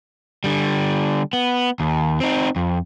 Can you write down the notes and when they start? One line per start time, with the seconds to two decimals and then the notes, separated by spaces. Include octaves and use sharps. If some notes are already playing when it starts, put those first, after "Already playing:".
0.44 D3 G3
1.33 B3
1.80 D#2
2.20 C4 D#4
2.56 F2